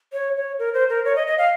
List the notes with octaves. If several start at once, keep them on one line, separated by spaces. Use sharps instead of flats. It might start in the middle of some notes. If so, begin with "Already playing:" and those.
C#5
C#5
A#4
C5
A#4
C#5
D#5
D#5
F5